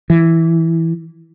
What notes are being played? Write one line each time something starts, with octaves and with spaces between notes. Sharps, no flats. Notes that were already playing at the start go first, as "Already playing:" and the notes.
E3